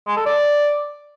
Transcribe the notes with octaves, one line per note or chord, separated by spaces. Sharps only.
G#3
A4
D5